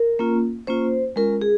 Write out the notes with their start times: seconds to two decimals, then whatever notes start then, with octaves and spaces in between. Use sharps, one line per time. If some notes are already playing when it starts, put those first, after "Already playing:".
Already playing: A#4
0.19 A#3 C#4 F4
0.67 A#3 C#4 F4 C5
1.16 G#3 C#4 F4 A#4
1.42 G#4